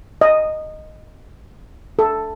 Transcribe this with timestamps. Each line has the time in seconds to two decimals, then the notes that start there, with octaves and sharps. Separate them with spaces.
0.21 D#5
1.99 A4